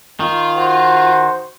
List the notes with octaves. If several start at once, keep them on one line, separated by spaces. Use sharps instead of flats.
D#3 F4
F#4 C5